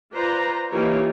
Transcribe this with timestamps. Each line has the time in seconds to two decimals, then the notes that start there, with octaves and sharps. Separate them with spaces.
0.13 F4 B4 C5 D5 A#5
0.71 E3 A#3 D#4 F4 G4 C#5